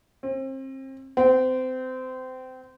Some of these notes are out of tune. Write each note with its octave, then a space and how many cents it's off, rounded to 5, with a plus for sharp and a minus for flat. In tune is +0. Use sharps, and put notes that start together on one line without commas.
C4 +35
C4 -25